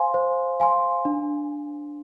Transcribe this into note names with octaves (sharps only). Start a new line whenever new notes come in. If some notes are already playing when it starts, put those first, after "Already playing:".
Already playing: C5 F5 G#5 C6
C5
F5 G#5 C6
D4